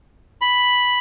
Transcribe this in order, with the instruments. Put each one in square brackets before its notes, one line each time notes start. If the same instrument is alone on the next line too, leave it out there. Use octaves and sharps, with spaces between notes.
[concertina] B5